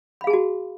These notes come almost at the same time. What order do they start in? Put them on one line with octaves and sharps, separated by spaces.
B5 F5 G#4 A5 F#4